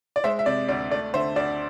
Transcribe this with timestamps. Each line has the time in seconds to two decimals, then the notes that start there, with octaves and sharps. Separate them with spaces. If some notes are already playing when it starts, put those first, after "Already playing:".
0.16 D5
0.24 G#3 C5 E5
0.39 E5
0.46 C3 D5
0.68 D2 D5
0.91 A3 D5
1.14 D3 C5 E5
1.36 D2 D5